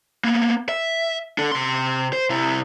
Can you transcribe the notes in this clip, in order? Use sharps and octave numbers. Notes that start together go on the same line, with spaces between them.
A#3 B3
E5
D4 A4
C3 C6
C5
C3 E4